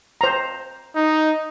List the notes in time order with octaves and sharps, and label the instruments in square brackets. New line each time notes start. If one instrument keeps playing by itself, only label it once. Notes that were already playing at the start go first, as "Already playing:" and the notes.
[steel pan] C5 A#5
[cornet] D#4